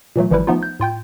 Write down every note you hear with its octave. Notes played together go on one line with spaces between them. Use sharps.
A#2 E3 F#3 A3
G#1 E3 F3 G3 E4 B4
F3 A3 B3 D#4 F4
G6
A2 F4 G5 G6